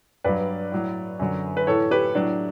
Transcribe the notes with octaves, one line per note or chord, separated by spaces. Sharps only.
G2 F#3 B4 D5
A2 F#3
F#2 D3 F#3
B4
A2 E3 A4 C#5
G4 B4
A2 F#3 D4